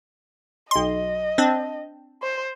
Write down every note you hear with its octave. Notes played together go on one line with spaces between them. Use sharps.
B1 D#5 C6
C4 D4
C5